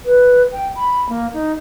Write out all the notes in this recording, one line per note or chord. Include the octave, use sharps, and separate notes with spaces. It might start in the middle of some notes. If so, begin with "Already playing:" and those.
B4
G5
B5
A#3
D#4